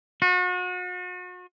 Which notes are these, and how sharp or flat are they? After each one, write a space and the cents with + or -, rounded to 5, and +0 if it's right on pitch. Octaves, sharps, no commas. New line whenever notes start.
F#4 -40